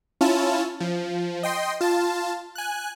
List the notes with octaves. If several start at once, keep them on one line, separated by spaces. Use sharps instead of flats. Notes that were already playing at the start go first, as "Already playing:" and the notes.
C#4 E4 F4 A5
F3
D#5 G5 C6
F4 A5
G#5 F#6